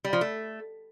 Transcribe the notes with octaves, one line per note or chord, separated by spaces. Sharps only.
G3
F3
A3